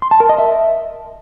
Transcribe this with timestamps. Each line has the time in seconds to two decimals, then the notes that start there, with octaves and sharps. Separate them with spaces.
0.02 C6
0.11 A5
0.20 A#4
0.29 D#5
0.38 E5